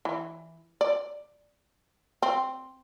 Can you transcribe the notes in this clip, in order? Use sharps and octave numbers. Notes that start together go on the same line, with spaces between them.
E3
D5
C4